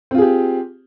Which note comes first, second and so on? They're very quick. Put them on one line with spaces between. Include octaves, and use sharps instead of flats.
C4 F4 G#4 G4